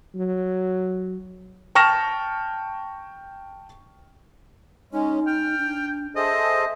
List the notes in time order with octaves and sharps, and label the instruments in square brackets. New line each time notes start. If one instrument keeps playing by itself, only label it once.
[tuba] F#3
[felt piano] G5 A5 C#6 F6 A#6 E7
[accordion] G#3 C#4 [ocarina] D#4
[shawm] G5 [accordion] F6
[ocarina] D4
[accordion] G#4 A4 C5 [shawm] D#5 [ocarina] E5